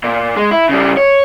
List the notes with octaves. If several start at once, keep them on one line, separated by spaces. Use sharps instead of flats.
A#2
G#3
E4
C#3 G3
C#5